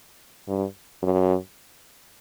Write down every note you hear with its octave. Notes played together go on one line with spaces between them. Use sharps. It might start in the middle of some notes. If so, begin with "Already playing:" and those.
G2
F#2